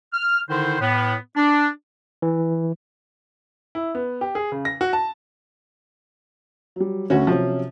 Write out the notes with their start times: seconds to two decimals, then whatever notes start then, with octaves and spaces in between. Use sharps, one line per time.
0.13 F6
0.49 D3 D#3 D#4 E4 C5
0.80 A2 B3
1.36 D4
2.22 E3
3.75 E4
3.95 B3
4.21 G4
4.35 G#4
4.52 C#3
4.65 A#6
4.81 F#4
4.93 A5
6.76 F#3 G3
7.10 D2 D3 C#4 F#4
7.27 C3 F3 F#3 C#4